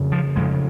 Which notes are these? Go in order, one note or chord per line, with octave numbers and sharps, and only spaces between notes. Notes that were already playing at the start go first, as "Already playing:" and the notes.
Already playing: F2 C#3
F3
F2 C#3 G#3